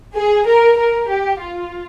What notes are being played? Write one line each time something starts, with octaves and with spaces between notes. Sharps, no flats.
G#4
A#4
A#4
G4
F4